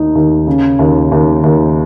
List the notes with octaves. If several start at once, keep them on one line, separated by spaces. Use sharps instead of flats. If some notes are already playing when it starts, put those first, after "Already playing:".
Already playing: D#2 D#3 D#4
D#2
C#3
D#2
D#2
D#2